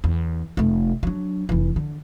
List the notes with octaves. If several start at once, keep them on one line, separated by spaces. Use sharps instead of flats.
E2
F1 A3
F#3 D4
F1 E3
D3